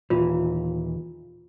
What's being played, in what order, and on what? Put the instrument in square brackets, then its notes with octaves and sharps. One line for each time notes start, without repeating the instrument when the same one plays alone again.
[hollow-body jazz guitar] D#2 A#2 E3 [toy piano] F4